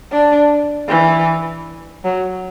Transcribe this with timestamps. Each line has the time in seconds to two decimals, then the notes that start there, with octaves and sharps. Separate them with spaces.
0.12 D4
0.88 E3
2.04 F#3